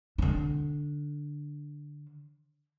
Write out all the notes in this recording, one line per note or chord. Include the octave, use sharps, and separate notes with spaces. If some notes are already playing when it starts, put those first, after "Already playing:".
D3 D4